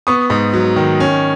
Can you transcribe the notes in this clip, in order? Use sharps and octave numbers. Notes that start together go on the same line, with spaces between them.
B3 C#6 D#6
G#2
F#3
D#3
C#4